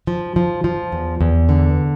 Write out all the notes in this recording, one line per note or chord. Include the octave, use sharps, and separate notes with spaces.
F3
F3
F3
E2
E2
D3